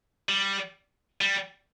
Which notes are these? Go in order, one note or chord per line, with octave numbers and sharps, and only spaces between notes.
G3
G3